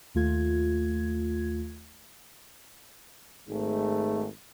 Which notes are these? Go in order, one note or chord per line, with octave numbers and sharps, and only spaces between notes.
D#2 A3 F4 G#6
G#1 G#2 G#3 A3